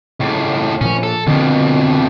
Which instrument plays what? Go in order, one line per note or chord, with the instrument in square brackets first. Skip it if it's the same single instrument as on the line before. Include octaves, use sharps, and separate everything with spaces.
[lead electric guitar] C#2 A2
[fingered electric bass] A#2 F3 [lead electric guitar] C#4
[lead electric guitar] A4
[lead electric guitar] F2 B2 [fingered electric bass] D3 F3